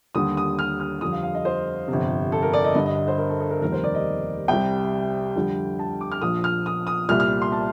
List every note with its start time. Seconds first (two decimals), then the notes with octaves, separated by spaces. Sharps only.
0.15 D#2 D3 G3 D#6
0.37 D#6
0.59 F6
0.80 F6
1.01 F2 D3 G3 D#6
1.12 F5
1.23 F5
1.35 D#5
1.45 C5
1.88 G1 F2 C3
2.32 A4
2.43 A#4
2.53 D5
2.65 D#5
2.75 G1 G2 D3 D#5
2.86 D#5
2.97 D#5
3.08 C5
3.18 A#4
3.30 A4
3.41 A4
3.51 A#4
3.62 F1 D#2 D#3 G3 A#4
3.72 C5
3.84 D5
3.95 D#5
4.48 C2 C3 G3 G5
5.35 F2 D3 G3
5.79 A5
6.01 D6
6.12 F6
6.22 A#1 A#2 F3 D#6
6.44 F6
6.66 D#6
6.87 D#6
7.09 C2 A#2 G3 F6
7.20 F6
7.42 C6
7.52 A5